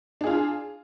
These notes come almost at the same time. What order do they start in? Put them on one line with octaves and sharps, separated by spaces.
D4 G#4 F4